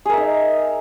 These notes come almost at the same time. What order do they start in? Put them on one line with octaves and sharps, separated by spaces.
G#4 A#4 E5 D#4